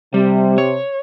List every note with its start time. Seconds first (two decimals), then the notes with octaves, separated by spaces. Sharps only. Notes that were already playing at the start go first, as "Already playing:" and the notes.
0.14 C3 G3
0.58 C#5